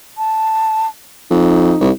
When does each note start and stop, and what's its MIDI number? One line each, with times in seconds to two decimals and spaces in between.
0.18 0.87 81
1.31 1.74 41
1.31 1.87 63
1.81 1.90 36